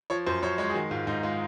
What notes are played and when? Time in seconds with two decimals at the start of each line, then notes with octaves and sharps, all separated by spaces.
0.10 F3 C#5
0.26 F#2 C5
0.42 F#2 C#5
0.58 G#3 C#5
0.70 G#4
0.74 D#3 F#4
0.91 G#2 F4
1.07 G#2 D#4
1.23 G#3 F4